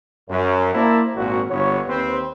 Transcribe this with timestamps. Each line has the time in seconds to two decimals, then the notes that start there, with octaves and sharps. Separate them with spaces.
0.30 F#2
0.74 A#3 E4 C5 D5 A5 A#5
1.16 G#1 A#2 F#4
1.49 G1 B3 C#5
1.87 D#2 C4 B4 C5